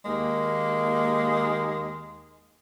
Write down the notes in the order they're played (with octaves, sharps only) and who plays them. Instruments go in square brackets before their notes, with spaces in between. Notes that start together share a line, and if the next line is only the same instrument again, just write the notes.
[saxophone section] D#2 G#3 A#3